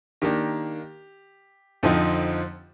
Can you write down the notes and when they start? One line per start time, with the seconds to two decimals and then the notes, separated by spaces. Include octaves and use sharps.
0.22 D#3 A#3 D4 G4
1.83 F2 D3 F3 C4 D#4